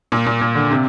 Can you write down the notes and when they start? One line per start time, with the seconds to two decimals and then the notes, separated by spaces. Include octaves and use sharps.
0.12 A#2
0.26 A#2
0.41 A#2
0.55 D3
0.71 C3